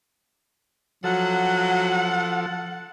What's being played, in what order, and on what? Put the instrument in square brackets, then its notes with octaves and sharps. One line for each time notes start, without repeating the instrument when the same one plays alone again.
[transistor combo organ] F3 A4 [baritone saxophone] F#3 [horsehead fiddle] F#5